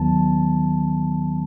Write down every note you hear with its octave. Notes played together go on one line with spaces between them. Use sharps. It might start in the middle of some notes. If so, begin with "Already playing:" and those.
Already playing: D#2 D#3 F#3 B3 A5